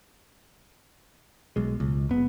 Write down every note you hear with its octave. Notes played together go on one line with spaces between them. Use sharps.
B1 G#3
C#2
F#1 B3